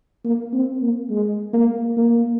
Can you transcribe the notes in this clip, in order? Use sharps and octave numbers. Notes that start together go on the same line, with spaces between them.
A#3
C4
A#3
G#3
A#3
A#3